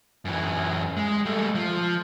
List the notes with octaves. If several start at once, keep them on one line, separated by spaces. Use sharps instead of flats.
F#2 E3
G#3
G3 A3
F3